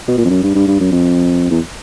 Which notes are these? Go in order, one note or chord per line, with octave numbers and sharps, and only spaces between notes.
B2
A#2
F2
F#2
G2
G2
G2
F#2
F2
E2